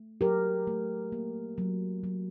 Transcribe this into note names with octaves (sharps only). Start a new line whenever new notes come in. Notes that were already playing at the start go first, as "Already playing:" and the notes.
Already playing: A3
F#3 G4 A#4
A3
A#3
F#3
F#3